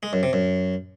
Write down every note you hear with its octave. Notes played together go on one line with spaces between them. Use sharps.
G#3
F#2
C3
F#2